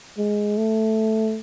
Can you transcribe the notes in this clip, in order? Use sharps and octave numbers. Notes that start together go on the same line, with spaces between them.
G#3
A3